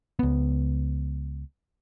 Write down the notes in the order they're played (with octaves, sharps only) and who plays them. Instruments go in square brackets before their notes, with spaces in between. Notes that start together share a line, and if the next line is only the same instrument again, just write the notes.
[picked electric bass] C#2 B3